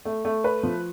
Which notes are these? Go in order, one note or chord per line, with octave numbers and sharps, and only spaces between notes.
A3
A3
B4
F3